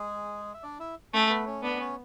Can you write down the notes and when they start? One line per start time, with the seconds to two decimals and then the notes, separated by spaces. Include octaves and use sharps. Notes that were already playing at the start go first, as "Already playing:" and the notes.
Already playing: G#3 G#4
0.54 E5
0.63 D4 D5
0.79 E4 E5
1.13 A3 C#4 C#5
1.29 B3 B4
1.46 C#4 C#5
1.63 B3 D4 D5
1.80 C#4 C#5